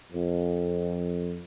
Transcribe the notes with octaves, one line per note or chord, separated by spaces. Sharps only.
F2